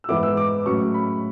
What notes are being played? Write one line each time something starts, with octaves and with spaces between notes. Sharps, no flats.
E6
G#2 E3 B3 E4 D6
E6
D6
A2 F#3 C#4 C#6
B5